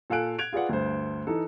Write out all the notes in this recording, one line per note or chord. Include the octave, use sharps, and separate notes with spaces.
A#2 A4 F5 G#5 F#6 D7
F#6 G#6 D7 F7
F4 G#4 B4 D5 F#5
D2 G2 C5
E3 D#4 A4